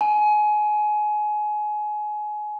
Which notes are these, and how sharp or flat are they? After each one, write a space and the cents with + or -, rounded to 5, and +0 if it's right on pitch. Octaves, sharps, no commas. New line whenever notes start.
G#5 +25